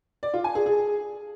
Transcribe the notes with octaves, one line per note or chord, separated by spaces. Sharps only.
D5
F4
G#5
G#4
G#4